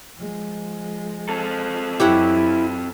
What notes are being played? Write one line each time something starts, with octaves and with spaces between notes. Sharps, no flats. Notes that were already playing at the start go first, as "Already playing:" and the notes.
F3 G#3
C4 A4
F#2 E4 G4 C#5 F#5